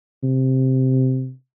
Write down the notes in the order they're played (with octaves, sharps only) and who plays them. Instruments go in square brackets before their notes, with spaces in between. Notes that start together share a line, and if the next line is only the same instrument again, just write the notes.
[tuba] C3